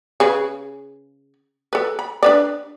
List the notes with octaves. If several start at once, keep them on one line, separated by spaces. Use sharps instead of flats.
C#3 G#4 B4
A4 B4
B5
D4 B4 D5